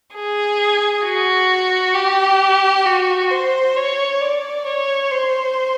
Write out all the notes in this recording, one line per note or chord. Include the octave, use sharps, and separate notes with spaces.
G#4
F#4
G4
F#4
C5
C#5
D5
C#5
C5